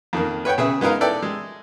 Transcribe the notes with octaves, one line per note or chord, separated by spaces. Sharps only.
F2 D#3 A#3
B4 C#5 F#5 G5
C#3 G#4 B4 E5
G#3 B3 D#4 A#4 F5
E4 A4 B4 D5 G5
G#3